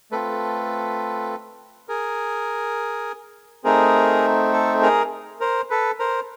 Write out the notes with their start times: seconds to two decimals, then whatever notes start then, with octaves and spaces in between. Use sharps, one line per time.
0.11 A3 C4 F4 A4 B4
1.88 G#4 A#4
3.64 A3 C4 D#4 G#4 A#4
4.53 A4
4.82 G#4 A#4
5.40 A#4 C5
5.70 A4 B4
5.99 A#4 C5